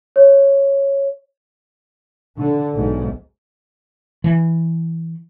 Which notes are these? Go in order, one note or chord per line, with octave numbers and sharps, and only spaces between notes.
C#5
D3
B1 G#2
E3